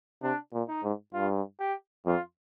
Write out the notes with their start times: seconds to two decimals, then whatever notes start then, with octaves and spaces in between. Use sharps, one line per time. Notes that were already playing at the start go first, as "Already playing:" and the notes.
0.23 C3 D4
0.53 A#2
0.68 D#4
0.83 G#2
1.14 G2 F4
1.60 G4
2.06 F2 F4